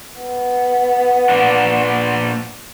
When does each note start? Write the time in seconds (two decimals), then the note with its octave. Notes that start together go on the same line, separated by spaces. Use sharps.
0.20 B3
1.29 A#2 D4